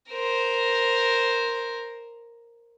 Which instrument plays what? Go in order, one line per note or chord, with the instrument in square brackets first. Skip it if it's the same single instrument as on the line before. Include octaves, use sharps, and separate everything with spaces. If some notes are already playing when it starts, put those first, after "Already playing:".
[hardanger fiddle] A#4 C5